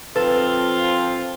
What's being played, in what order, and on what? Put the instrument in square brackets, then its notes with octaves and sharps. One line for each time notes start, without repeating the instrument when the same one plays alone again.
[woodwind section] F3 C4 [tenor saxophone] F4 [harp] A4 [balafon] B4